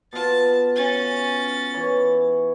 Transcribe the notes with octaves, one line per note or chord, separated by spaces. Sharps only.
B2 F4 A5 A6
C#4 A6
E3 C#5